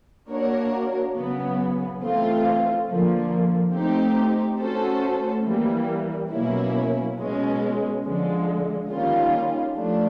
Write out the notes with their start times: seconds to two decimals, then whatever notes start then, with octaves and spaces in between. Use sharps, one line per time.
0.28 A#3 D4 F#4 A#4 C#5
1.14 C#3 F#3 B3
2.00 E3 A3 C4 F4
2.87 D3 F3 A#3
3.73 A3 C4 D#4 G4
4.59 A3 C#4 F#4 A4 C5
5.45 E3 G3 A#3
6.31 B2 F#3 A#3 C#4 E4
7.17 B2 G#3 C#4
8.04 D3 F3 G#3
8.89 D#3 G3 A#3 C#4 F4
9.75 F3 A3 D4